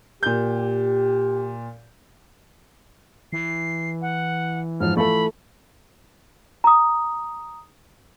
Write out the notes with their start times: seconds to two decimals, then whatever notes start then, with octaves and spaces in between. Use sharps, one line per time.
0.23 A#2 G4 G6
3.33 E3 C7
4.02 F#5
4.80 G#2 F3 F6
4.97 A3 F4 A4 B5
6.64 A#5 D#6